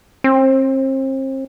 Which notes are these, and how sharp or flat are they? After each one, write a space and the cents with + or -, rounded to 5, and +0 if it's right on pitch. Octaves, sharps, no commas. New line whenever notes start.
C4 +35